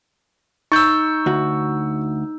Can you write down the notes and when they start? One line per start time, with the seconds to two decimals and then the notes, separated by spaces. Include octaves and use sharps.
0.72 D#4 C#6 E6 G6
1.26 D2 F#4